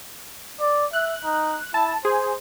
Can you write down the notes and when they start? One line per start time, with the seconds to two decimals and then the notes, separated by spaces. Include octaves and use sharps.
0.61 D5
0.93 E5 F#6
1.24 D#4
1.74 E4 A5
2.05 G#4 C5